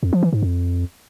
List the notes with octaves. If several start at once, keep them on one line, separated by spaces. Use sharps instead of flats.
F2
F3
E3
G#2
F2